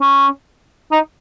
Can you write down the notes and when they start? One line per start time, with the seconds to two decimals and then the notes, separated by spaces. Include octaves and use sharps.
0.01 C#4
0.92 D#4